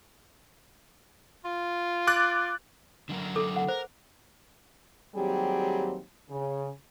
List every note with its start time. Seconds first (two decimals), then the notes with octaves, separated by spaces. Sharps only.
1.45 F4
2.07 D6 F#6 A6
3.09 D3 F#3 A#4
3.36 A4 D6
3.56 F#5
3.69 A#4 C5
5.15 D#2 F#3 G3 C4 G4 G#4
6.30 C#3